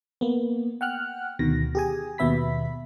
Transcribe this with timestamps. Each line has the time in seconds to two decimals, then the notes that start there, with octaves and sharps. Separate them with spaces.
0.21 A#3 B3
0.81 F#5 G5 F6 F#6
1.39 D2 B2 D#3 A#6
1.75 G4 G#4 G#5
2.18 D#2 B2 B3 E5 B5 B6